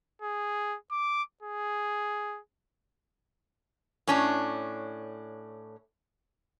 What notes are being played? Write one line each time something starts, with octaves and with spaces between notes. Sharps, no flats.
G#4
D6
G#4
A2 C#4 D4